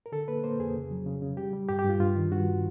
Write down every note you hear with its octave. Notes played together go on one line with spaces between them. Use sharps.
A#4
D3 A4
A#3 B4
A#3 C5
F2 G#4
C#3
F#3
C#3
C#3
G3 G4
G3
G2 G4
G4
G2 F4
G2 F4
D#3
G2 F#4